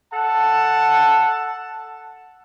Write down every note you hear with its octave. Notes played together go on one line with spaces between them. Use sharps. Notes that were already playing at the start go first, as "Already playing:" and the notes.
A4 F#5 A5